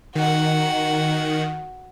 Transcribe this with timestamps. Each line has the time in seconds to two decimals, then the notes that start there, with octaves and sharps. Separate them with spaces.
0.15 D#3 F#4 F#5